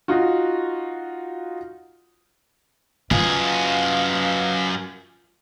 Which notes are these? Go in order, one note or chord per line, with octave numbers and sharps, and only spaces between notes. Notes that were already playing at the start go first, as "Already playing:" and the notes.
D#4 F4 F#4
F#2 F4 G#4 B4 D#5 F5